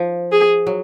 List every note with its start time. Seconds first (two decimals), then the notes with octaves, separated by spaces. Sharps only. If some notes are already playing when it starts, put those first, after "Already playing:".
Already playing: F3
0.32 G#4
0.67 F#3